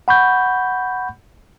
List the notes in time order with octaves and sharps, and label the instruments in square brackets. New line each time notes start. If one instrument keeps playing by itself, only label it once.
[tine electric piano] F#5 B5 C#6 G6